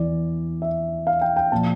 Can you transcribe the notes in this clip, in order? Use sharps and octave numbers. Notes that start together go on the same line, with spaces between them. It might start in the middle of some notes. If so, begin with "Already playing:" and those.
Already playing: E2 E3 D5
E5
F5
G5
G5
A#2 F3 A5